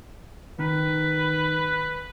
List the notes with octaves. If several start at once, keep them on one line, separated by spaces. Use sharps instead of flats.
D#3 B4